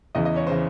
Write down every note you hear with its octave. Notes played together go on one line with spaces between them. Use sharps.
E2 C#3 E3 D#5
D#5
C#5
C#3 E3 C5